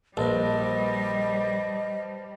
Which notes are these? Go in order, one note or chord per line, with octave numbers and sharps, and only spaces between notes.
A#1 G3 B4 C5 D#5 A5